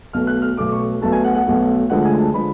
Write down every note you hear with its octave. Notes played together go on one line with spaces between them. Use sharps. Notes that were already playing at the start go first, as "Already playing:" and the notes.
B1 B2 A3 F6
F#6
F6
B1 B2 A3 D6
C#6
B1 B2 A3 A5
G#5
F#5
F#5
B1 B2 A3
D2 D3 F3 G#3 F#5
G#5
A5
D3 F3 G#3 B5